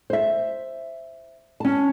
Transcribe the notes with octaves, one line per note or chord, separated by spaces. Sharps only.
C5 E5
C#4 A5